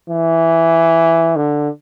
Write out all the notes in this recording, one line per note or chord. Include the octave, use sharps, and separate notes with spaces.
E3
D3